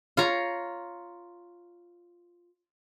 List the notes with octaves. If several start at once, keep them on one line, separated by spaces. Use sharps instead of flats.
F4 C#5 A#5